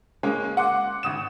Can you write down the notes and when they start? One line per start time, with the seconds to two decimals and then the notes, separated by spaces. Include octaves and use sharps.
0.23 G#3 A#3 C#4
0.57 F#5 C6 D6 F#6
1.03 G#1 D#6 E7